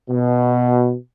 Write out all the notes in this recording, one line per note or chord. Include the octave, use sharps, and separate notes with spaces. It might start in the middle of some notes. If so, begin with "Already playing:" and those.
B2